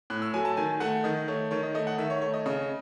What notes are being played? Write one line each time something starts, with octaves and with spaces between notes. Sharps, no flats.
A2 F#6
E6
F#3 A3 G#5
A5
D#3 G#5
A3 F#5
D#3 D#5
A3 C#5
D#3 C#5
D#5
A3 D#5
F#5
D#3 E5
C#5
A3 C#5
D#5
C#3 D#5